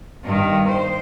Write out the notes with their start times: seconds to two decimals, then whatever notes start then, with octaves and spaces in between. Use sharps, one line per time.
0.24 G2 D#3
0.68 C5